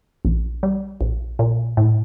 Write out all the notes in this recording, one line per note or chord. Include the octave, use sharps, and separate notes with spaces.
A#1
G3
A#1
A#2
A2